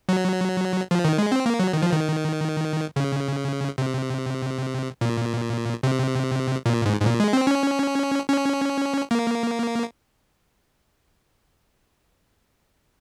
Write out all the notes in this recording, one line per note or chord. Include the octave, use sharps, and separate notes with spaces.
F#3
F3
D#3
G#3
C4
A#3
F#3
D#3
F3
D#3
C#3
C3
A#2
C3
A#2
G#2
G#2
A#2
G#3
C4
C#4
C#4
A#3